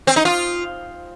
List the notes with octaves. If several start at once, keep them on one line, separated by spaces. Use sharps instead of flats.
C4
D#4
F4